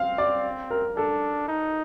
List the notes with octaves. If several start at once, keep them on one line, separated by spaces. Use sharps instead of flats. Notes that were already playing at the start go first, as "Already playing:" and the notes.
Already playing: C4 F5
D5
A#4
D4 A4
D#4